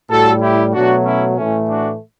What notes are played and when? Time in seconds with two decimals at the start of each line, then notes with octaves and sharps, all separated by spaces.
0.10 A2 G3 F#4 A4
0.42 E4 G4
0.73 B2 F#3 A3 D4 F#4
1.05 C#4 E4
1.37 A2 E3 A3 C#4
1.68 D4 F#4